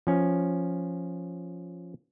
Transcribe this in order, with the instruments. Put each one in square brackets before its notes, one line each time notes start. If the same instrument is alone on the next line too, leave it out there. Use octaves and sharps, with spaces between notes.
[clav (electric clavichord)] F3 C#4